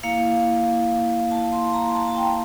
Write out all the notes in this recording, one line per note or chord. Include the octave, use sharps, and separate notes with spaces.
A#3 E4 F5
A5
C6
A#5
A5
A5
G5